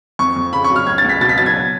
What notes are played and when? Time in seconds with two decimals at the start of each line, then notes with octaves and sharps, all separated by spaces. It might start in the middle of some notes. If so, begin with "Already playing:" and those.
0.19 F2 C#6
0.36 F2
0.53 C#3 B5
0.64 C#6
0.70 F#3
0.76 F6
0.87 C#2 G#6
0.98 A6
1.04 C#2
1.09 B6
1.21 B2 A6
1.29 B6
1.38 F#3 A6
1.46 G#6